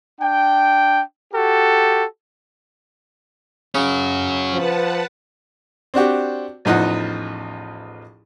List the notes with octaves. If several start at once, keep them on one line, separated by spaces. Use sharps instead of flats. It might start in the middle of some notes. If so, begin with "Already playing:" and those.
D4 G5
F#4 G4 A4
C#3 C#4 F#4
F3 B4 F#5 A5
C4 D4 F#4 G4
A1 E2 F3 D#4 F#5